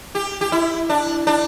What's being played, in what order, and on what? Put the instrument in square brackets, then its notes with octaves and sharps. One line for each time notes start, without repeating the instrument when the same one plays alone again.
[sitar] G4
G4
E4
D4
D4